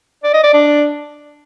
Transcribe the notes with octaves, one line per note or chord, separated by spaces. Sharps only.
D5
D#5
D5
D4